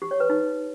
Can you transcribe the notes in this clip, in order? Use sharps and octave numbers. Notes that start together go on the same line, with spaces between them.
G4
C#5
B4
D#4